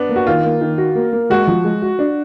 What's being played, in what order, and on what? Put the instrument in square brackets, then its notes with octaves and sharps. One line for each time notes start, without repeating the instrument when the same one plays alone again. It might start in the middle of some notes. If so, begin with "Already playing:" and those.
Already playing: [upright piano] B3 D4
[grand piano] A#3
[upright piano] F#4
[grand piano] D#3 [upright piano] F4
[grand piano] A#3
D#3
F#4
A#3
A#3
[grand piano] G#3 [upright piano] F#4
[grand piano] F3
G#3
F#4
D4